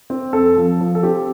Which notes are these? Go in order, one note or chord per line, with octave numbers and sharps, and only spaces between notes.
C4
F2 A4
F3
F3
A4
C4 G4